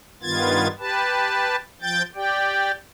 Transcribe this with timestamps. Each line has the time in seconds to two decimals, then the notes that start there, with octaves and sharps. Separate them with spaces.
0.22 G2 D#3 B3 F4 G#6 A6
0.79 G4 B4 A5
1.82 F3 G5 G6 A6
2.15 G4 D5 G5